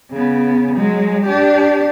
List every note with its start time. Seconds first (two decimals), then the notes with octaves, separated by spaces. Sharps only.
0.12 C#3 B3
0.76 F#3 G#3
1.26 D4 G4